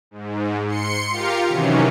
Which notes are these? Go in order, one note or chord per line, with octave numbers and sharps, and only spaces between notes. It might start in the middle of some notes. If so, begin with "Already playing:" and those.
G#2
C6 C#7
F4 G4 A#4 F5
C3 D#3 E3 F#3 C#4